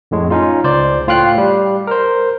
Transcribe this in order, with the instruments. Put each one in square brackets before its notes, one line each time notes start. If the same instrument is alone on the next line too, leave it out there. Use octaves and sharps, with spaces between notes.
[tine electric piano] F2 A2 G#3
C#4 D#4 F4
C#2 C5 D5
A2 F4 F5 G5 F#6 C7
G3
A#4 C5